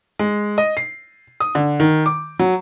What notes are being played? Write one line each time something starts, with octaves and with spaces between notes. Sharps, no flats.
G#3
D#5
C7
D#6
D3
D#3
D6
F#3